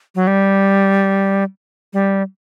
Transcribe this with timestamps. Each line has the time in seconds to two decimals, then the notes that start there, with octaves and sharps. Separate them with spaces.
0.15 F#3
0.27 G3
1.93 G3